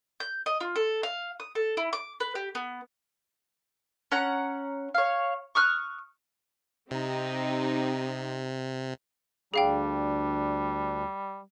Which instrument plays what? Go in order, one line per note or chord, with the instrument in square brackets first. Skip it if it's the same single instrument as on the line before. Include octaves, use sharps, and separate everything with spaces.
[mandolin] G6
D#5
F4
A4
F5
D#6
A4
E4
D6
B4
G4
B3
C#4 F#5 A#5
C#5 F5
C#6 D#6 F6 F#6
[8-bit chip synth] C3 [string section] C4 D#4 G4
[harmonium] D2 D4 [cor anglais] G3 [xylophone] G#4 F5 G5